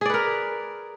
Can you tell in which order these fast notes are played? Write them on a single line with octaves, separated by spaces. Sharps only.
G#4 D5 B4 A#4